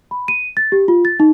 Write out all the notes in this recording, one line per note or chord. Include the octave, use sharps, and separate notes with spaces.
B5
D#7
A6
G4
F4
A6
D#4